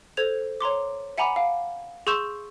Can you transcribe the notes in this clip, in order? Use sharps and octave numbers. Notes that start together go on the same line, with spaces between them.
A4 C5 G#6 F7
C#5 A#5 C6 D6
E5 F#5 G#5 A#5 B5 D6
F5
G#4 C6 C#6 E6 G6 E7